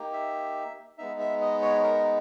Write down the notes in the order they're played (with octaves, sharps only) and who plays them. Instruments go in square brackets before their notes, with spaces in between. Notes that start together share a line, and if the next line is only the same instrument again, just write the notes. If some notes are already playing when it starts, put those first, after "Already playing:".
Already playing: [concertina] A#3 D#4 G4
E5
G#3 B3 D#4 E5
E5
D#5
C#5
A#4